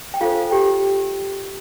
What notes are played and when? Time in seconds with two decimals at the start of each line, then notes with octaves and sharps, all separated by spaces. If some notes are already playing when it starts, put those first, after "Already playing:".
0.14 G5
0.21 D4 F4 A4 C5 F5
0.51 G4 G5